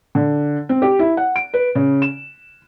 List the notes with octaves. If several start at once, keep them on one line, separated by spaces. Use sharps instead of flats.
D3
C4
G4
E4
F#5
D7
B4
C#3
E7